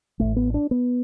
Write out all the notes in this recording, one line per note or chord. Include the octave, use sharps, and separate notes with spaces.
A1 A2 A3
B3
D4
B3